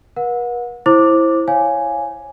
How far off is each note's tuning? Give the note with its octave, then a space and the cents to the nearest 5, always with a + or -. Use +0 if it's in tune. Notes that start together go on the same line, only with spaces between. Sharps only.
B4 -45 F#5 -35
E4 +0 C5 +20 D6 +0
C#5 +0 F5 +0 G#5 +0